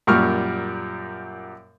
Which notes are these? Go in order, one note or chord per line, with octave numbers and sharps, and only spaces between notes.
F#2 A#2 G3 C#6 F6